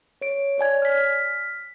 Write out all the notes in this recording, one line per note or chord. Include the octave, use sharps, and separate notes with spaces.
C#5 D7
C#5 D5 G#5 G#6
F6 B6